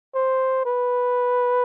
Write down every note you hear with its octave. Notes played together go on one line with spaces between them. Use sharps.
C5
B4